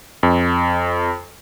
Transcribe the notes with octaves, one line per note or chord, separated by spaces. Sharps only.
F2